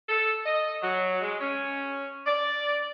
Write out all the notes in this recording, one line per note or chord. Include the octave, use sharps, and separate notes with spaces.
A4
D#5
F#3
G#3
C#4
D5